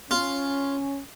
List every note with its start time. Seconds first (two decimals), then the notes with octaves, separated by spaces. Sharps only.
0.11 C#4 F4